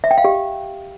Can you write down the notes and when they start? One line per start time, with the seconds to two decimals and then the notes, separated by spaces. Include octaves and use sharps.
0.04 E5
0.11 G5
0.18 F5
0.24 G4